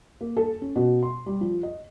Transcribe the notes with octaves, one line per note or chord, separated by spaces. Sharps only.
A#3
A4
C#4
B2
C6
G3
F3
D#5